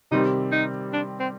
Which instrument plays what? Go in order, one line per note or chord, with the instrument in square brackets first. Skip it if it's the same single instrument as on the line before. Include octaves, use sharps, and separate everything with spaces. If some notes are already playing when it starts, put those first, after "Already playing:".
[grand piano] C3 D#3 G3 C4 [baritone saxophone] D#4
[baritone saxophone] D#4
D4
C4